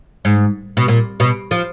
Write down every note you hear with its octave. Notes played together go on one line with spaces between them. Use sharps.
G#2
B2
A#2
B2
F3